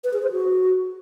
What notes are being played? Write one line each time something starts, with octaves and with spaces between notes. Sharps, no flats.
B4
G#4
C5
F#4